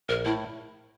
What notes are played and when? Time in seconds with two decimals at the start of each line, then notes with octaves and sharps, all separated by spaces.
0.09 A#1 A#4
0.25 A2 E4